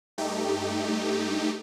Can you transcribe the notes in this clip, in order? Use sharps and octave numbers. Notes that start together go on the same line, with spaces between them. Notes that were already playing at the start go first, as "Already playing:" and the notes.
G2 A3 D#4 G4